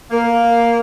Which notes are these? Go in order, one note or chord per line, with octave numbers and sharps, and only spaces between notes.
A#3